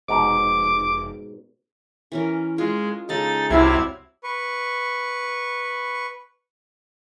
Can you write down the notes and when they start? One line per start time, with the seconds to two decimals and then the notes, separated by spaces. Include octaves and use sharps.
0.09 F1 G#2 B2 A#5 D6
2.12 E3 C#4 A#4
2.58 G#3 F4
3.09 C#3 G#3 D#4 A4 A6
3.50 C2 C3 F#3 G3 E4 G4 F5 G#6
4.24 B4 C#6